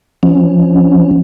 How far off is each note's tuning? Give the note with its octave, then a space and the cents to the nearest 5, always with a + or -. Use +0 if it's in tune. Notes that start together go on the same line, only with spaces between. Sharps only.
F3 -15 C#4 +0